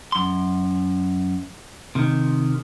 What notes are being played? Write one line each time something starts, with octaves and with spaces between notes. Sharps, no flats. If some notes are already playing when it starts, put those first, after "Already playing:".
F#2 C6
C3 D#3